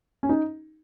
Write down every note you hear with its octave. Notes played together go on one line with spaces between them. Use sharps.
C#4
D#4